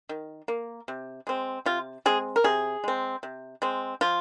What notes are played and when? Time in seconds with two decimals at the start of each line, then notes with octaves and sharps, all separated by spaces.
0.09 D#3
0.48 A#3
0.88 C3
1.27 G#3 C4
1.66 C3 F4
2.06 G#3 C4 G#4
2.36 A#4
2.44 C3 G#4
2.84 G#3 C4
3.23 C3
3.62 G#3 C4
4.01 F3 F4